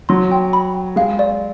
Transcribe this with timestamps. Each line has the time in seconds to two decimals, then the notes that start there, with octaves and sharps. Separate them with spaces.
0.09 F#3 C6
0.31 G5
0.53 B5
0.75 G5
0.96 G#3 F5
1.19 D5